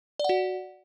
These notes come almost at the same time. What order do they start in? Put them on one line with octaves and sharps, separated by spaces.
D5 F#5 F#4